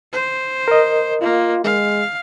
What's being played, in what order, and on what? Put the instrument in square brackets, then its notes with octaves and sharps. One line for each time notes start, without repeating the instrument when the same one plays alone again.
[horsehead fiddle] C5
[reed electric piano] A#4 D#5
[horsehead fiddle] A#3 [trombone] F4
[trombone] G#3 [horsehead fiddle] F5